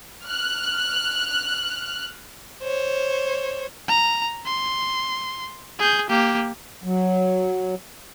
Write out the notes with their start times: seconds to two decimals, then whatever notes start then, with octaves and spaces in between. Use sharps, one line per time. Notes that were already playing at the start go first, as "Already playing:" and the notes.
0.24 F6 F#6
2.62 C5 C#5
3.88 A#5
4.46 C6
5.79 G#4 G6
6.09 A#3 G4
6.84 F#3